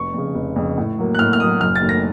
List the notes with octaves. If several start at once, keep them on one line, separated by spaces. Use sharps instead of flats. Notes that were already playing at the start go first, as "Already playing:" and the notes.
Already playing: F1 C#6
F2 C#3
F1
F2 C#3
A2
F#3 A#3
F#6
A2 F6
F6
F#3 A#3 D#6
F#1 F6
A6
F#2 D#3 A3
A#6